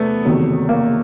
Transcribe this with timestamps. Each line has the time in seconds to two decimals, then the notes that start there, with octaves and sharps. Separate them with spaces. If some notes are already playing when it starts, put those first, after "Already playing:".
Already playing: E2 C3 A3 B3
0.25 F#1 E2 C3 D#3 F#3
0.69 A#3